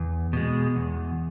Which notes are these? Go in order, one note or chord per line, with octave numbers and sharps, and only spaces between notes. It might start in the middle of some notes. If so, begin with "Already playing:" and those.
Already playing: E2
B2 G#3
E2